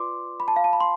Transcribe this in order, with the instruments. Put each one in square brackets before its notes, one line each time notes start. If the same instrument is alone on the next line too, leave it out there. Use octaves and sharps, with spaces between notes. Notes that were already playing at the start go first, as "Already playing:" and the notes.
Already playing: [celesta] F4 B4 D5 C6 D6
B5
A5
F5
A5
B5
C6